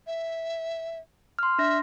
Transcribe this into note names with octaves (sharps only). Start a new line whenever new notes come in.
E5
C6 F6
D4 E5 A#6